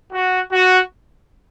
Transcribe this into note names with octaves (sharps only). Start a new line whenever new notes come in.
F#4
F#4